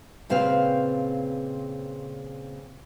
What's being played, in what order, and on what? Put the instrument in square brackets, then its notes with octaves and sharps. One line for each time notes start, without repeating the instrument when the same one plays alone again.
[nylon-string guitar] A#2 C#3 C4 B4 F5